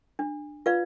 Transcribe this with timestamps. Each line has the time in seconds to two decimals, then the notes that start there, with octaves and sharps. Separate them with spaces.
0.19 D4
0.66 F4 B4 D5 F5